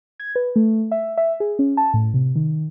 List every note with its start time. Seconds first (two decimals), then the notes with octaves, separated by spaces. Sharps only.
0.20 G#6
0.36 B4
0.56 A3
0.91 E5
1.18 E5
1.40 G#4
1.59 C#4
1.77 A5
1.94 A2
2.14 C3
2.35 D#3